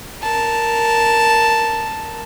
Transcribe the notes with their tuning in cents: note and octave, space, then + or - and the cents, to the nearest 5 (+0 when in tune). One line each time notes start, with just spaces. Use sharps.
A#4 +0 A5 +0